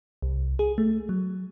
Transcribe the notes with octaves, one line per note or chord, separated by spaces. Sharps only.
C2
G#4
A3
F#3